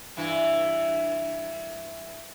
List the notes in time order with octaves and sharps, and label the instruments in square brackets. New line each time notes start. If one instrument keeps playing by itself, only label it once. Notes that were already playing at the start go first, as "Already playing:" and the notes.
[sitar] G2 E3 E4